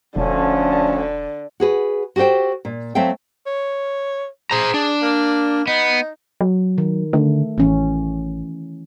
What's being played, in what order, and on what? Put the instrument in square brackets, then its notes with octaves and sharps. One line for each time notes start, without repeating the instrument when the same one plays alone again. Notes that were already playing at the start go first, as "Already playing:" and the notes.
[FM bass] E1 [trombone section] D2 F3 C#4 [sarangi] D3
[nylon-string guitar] F#4 G#4 B4
F#4 G4 A4 C5 G5
A#2
F#3 A3 C4 E5 F5 G5
[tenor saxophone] C#5
[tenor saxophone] G#4 [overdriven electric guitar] C5 A#5
[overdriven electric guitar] D4
[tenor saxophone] A#3
[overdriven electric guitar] B3 [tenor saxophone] D#4
[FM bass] F#3
[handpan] D#3
[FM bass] D3 [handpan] A3
[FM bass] A1 [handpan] E3 C#4